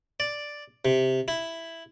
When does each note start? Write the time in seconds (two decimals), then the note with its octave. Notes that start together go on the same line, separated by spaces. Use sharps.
0.20 D5
0.85 C3
1.28 E4